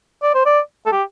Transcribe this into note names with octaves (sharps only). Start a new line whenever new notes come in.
D5
C5
D5
A4
G4